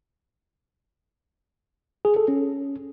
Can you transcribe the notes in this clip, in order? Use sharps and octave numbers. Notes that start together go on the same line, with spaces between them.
G#4
A4
C#4